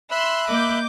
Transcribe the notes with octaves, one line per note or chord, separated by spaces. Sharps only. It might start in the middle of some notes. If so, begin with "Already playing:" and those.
E5 B5 C6 E6 F#6
A#3 D#5 D6 G6